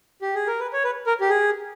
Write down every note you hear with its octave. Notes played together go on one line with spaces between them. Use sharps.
G4
G#4
A#4
B4
C#5
B4
A#4
G4
G#4